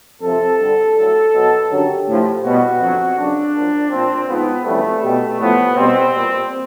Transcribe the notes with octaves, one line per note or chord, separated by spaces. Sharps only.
F2 C3 F3 A4
G2 D3 G3
A2 F#3
B2 F#3
F#2 D3 F#3 G4
A2 F3
B2 G3 F#4
F2 D3 F#3
F#2 C#3 F#3 D4
A#2 F3
A#2 F3 C4
G#2 F3 B3
F2 C#3 E3 G3 A3
B2 G3
A2 F3 B3
B2 G3 C4
A#2 G3